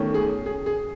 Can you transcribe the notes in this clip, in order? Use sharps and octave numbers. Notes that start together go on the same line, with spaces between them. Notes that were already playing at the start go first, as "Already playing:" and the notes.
Already playing: E2 D#3 A3 C#4
G#4
G#4
G#4